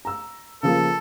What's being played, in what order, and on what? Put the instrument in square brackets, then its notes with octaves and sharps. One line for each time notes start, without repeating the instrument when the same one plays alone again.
[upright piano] A#5 E6
[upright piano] C#3 F3 A#3 [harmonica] A4